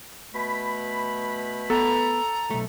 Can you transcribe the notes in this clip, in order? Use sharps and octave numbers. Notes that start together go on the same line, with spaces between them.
B2 A3 B5
B3 A4 A#5
B1 A3